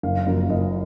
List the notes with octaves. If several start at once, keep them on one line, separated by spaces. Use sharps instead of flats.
F#1 F5
F#2 C#3 F3 A#3
F#1 D#5